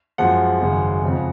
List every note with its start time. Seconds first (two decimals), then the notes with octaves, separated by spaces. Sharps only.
0.18 F#2 F3 G#3 F#5
0.60 G#1 F#2 C#3 G#3
1.03 F2 C#3 F3 G#3